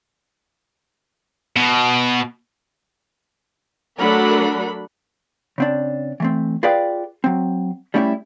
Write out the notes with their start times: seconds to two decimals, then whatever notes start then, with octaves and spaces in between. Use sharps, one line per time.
1.57 B2
3.99 F#3 A3 D4 A#4 F#5 B5
5.58 C#3 C4 D4
6.20 E3 A3 C4
6.63 F4 G#4 B4 D5 F5 G5
7.24 F#3 C4
7.94 G3 A3 C#4 D#4 E4 G4